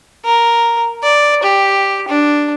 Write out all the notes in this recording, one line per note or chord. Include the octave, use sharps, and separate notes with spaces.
A#4
D5
G4
D4